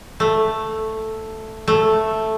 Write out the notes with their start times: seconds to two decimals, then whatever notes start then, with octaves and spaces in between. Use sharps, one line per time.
0.20 A3
1.68 A3